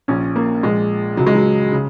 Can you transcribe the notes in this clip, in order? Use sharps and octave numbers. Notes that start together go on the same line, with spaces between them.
A#1 A#2 C#4
A#3
A#1 A#2 G#3
C#2 C#3 F#3
G#3
F#3
C#3